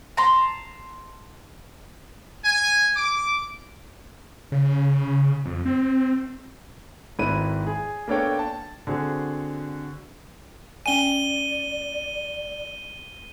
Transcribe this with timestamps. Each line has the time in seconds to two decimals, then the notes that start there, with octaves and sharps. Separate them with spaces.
0.17 A5 A#5 C6
2.45 G#5
2.96 D6
4.52 C#3
5.45 F2
5.65 C4
7.19 G#1 G#2 D#3 E4 B4 D#7
7.67 G#4
8.08 A#3 B3 D4 A4 C#5 G5
8.39 A5
8.87 D3 C4 F#4 G#4
10.86 C#4 D5 G5 G#5 D#7 G7